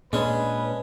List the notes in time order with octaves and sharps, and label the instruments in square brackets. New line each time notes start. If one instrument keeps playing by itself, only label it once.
[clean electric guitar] A#2 C#4 D4 [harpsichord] G#3 [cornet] B4